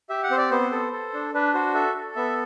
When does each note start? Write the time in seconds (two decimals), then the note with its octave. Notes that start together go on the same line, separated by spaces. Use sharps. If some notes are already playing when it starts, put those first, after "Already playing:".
0.09 G4 E5
0.23 F#5
0.30 C4 C5
0.38 D5
0.51 B3 C5
0.72 A4
0.93 A4
1.14 D4
1.34 D4 B4
1.54 F#4 C5
1.74 A4 E5
1.96 A4
2.16 B3 E5